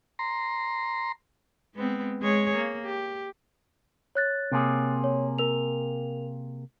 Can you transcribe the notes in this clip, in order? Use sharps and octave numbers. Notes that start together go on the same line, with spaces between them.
A#5 C6
G#3 B3 C4
G#3 G#4 C#5
A#3
G4
C#5 F#6 A6
C3 A#3 G#4
C#5
A#4 F7